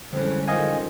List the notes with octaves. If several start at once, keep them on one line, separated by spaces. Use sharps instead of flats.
F2 D3 E3 G3 G#3 C#4
F2 D#3 F3 D#5 F5 G#5